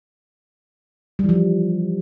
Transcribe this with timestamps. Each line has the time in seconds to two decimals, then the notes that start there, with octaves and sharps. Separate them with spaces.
1.19 G3
1.24 E3
1.29 F3